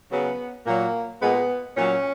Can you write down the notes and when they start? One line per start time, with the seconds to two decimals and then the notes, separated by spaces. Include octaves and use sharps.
0.11 C#3 F#3 B3
0.66 A#2 F#3 A#3
1.21 A#2 G#3 B3
1.77 A#2 F#3 C#4